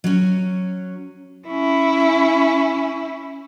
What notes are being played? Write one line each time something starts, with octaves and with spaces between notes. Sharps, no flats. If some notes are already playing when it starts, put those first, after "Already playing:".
F#3 C#4
C#4 E4